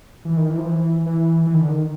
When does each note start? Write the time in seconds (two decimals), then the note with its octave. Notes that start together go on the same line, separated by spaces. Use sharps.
0.25 E3
0.37 D#3
0.50 E3
0.58 F3
0.66 E3
1.06 E3
1.47 E3
1.54 D#3
1.61 D3
1.69 D#3